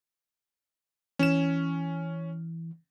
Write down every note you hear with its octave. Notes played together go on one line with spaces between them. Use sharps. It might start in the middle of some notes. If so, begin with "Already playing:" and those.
E3 C#4 E7